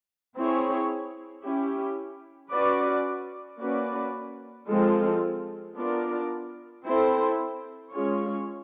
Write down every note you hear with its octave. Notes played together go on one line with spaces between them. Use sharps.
C4 E4 G#4 C#5
C#4 E4 G4
C#4 F#4 B4 D5
A#3 C#4 F#4 B4 D5
F3 G#3 C4 F4 A4
B3 D4 F4 A#4 D5
C4 E4 A4 C5
G#3 C#4 F4 G#4 C#5